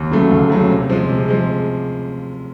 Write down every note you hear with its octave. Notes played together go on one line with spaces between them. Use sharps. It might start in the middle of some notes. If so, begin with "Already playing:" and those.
Already playing: D#2
C#3 F#3 A3
D#2
C#3 F#3 A3
C3
F3 G#3
C3
F3 G#3